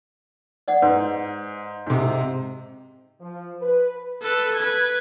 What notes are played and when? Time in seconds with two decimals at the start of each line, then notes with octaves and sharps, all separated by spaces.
0.68 D5 D#5 F#5
0.82 G#2 B4
1.87 G#2 C3
3.20 F3
3.61 B4
4.22 A4 B4
4.55 B4 G#6